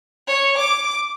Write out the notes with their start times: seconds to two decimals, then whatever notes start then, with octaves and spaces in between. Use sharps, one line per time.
0.27 C#5
0.58 D6